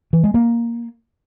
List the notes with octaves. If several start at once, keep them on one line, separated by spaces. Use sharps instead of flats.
E3
G#3
A#3